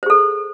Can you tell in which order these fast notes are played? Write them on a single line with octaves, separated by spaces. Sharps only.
C5 G#4 A4